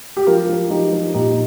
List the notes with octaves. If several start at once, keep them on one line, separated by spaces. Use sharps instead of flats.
G4
F3 F4 A#4
F3
F3 D#4 G4
F3
A#2 D#4 G4